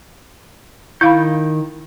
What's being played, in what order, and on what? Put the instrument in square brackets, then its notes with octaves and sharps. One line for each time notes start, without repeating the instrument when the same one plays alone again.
[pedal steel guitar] D#3 G6 [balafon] E4 F5 B5